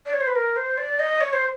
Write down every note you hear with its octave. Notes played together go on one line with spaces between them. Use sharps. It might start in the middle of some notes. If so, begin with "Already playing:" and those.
D5
C#5
C5
B4
A#4
C5
D5
D#5
C#5
C5